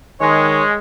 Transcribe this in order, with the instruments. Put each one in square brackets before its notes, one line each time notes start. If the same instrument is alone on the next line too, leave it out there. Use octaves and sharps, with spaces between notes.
[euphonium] D#3 [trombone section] G#3 [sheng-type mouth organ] C#5